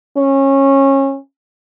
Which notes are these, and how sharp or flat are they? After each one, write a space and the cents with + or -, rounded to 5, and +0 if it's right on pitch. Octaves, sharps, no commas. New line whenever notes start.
C#4 -25